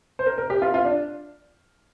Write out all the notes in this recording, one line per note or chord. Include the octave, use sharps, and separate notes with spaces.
C5
A#4
A#4
G4
F4
F4
D4